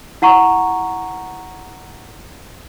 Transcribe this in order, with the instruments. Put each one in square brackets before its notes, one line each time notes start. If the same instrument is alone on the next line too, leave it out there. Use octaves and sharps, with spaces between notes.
[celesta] E4 F#5 A#5 C#6